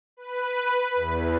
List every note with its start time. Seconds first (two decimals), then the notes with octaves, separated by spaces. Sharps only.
0.17 B4
0.95 E2